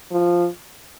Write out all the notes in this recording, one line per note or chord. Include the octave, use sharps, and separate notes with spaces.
F3